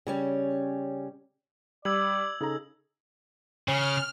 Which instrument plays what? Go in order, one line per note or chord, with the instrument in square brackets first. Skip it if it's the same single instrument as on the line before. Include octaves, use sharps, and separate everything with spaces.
[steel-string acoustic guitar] C#3 G3 C#4
[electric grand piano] G3 [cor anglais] D5 [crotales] E6 G#6 F#7
[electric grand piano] C#3 A#5 [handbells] D#4 G#4 A4
[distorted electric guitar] C#3 [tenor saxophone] C#4 [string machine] F6